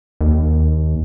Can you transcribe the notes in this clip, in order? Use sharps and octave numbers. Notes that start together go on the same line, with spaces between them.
D#2